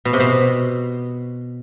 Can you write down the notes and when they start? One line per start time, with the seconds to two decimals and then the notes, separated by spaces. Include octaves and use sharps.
0.05 B2
0.13 C3
0.20 B2